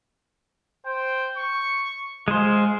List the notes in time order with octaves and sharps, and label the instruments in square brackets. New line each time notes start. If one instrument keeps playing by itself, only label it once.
[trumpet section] C5 G5
C#6
[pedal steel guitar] G#3 C5 [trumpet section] F4 G#4